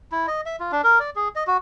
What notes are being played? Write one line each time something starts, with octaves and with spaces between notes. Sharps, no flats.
E4
D#5
E5
F4
D4
A#4
D5
G#4
D#5
F#4